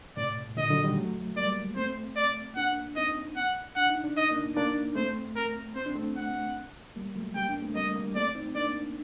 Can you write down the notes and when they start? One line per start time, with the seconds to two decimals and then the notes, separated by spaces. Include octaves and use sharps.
0.17 A2 C3 D5
0.57 A#2 D3 D#5
0.70 D3 F#3
0.83 D#3 G3
0.96 F#3 A3
1.36 G3 A#3 D5
1.76 A3 C4 C5
2.16 D5
2.56 A#3 D4 F#5
2.96 C4 D#4 D#5
3.36 F#5
3.76 D4 F#5
3.90 D#4
4.04 D4
4.17 D#4 D#5
4.31 A#3 D4
4.56 A#3 D4 D5
4.95 A3 C4 C5
5.36 A#4
5.75 C4 C5
5.86 D4
5.95 A3 C4
6.17 F#5
6.96 G3 A#3
7.16 F#3 A3
7.35 G3 A#3 G5
7.49 A#3 D4
7.62 A3 C4
7.75 G3 A#3 D#5
7.96 G3 A#3
8.15 A3 C4 D5
8.35 C4 D#4
8.55 A#3 D4 D5